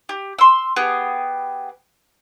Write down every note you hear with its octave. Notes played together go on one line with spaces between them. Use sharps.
G4
C6 E6
B3 G4 G#4